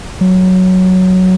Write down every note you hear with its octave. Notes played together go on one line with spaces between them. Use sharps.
F#3